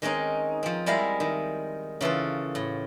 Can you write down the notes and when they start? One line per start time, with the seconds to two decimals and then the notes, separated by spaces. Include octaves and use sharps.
0.02 D#3 G#3 C4 C#4 D#4
0.63 F3 C4
0.86 G3 G#3 E4 A#4 F5
1.20 D#3
2.01 C#3 E3 F4 A4
2.55 A2